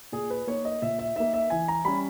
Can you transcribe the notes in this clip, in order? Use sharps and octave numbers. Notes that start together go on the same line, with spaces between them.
A#2 G#4
B4
A#3 D#4 C#5
D#5
A#2 E5
E5
A#3 D#4 E5
E5
E3 G#5
A#5
G3 C#4 B5